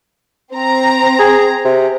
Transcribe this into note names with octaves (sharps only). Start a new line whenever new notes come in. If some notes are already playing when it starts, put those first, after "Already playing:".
C4 A#5
G#4
C3